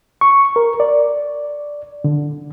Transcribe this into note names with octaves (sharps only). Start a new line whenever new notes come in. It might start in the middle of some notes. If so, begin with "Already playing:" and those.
C#6
A#4
D5
D3